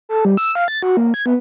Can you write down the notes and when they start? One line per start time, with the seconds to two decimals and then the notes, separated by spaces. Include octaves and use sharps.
0.09 A4
0.25 G3
0.37 E6
0.55 F5
0.68 A6
0.83 F#4
0.97 A#3
1.14 G#6
1.26 B3